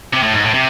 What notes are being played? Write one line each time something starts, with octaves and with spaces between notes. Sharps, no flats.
C3
A2
G#2
A2
C3